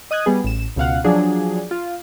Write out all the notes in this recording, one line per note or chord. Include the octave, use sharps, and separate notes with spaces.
D#5 D#6 F#6 G#6
G3 B3 G#4
A1 E7
C#2 B2 F5 F#5
F3 F#3 D4 G#4
F4